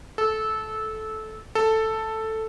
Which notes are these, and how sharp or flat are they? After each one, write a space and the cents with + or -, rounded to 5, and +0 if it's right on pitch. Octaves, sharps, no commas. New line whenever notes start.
A4 -15
A4 +5